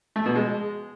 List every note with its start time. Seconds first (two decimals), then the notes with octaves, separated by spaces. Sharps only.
0.16 A3
0.26 B2
0.36 G#3